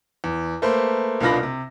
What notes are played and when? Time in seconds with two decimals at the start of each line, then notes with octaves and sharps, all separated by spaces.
0.24 E2
0.62 A3 A#3 B4 C5
1.21 C2 B2 D4 F4 B5 A#6
1.43 C3